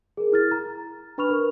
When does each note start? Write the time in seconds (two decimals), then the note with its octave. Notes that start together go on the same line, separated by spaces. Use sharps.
0.17 G#4 A#4
0.32 E4 F6 A6
0.51 A#5
1.18 D4 B4 B5 C#6 F6 F7
1.30 A#4